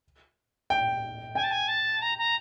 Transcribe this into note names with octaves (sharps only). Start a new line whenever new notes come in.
G5
G5 G#5
A5
G#5
A5
A#5
A#5